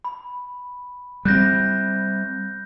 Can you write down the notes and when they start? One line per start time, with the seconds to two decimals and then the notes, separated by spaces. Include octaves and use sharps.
0.05 B5
1.25 G3 A3 C4 F#6 G6 A#6